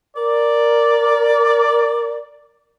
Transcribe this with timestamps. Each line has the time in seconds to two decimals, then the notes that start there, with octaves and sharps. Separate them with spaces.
0.17 A#4 D5